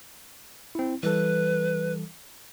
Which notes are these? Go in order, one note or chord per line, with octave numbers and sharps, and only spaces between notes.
C4 E4
E3 G3 A4 B4